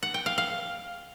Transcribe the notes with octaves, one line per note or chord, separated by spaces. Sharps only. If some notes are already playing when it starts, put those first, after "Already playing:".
F#5
G5
F5
F5